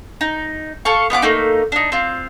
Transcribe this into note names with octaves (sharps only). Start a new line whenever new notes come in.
D#4
A4 F5 C#6
B3 F4 F#5 D6
A3 A#3 D#4
D4 D#4
C4 F4